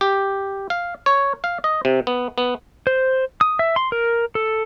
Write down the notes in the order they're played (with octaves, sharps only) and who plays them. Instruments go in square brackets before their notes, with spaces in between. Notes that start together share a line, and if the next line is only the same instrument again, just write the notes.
[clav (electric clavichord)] G4
F5
C#5
F5
D#5
C3
B3
B3
[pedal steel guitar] C5
D#6
E5
C6
A#4
A4